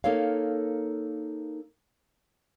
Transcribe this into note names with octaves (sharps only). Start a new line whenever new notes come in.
A#3 D#4 A4 A#4 C#5 F5